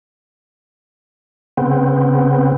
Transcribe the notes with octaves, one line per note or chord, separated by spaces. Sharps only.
C#3 B3 C4